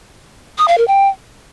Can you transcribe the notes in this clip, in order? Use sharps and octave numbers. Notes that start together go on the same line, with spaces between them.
D#6
F5
A#4
G5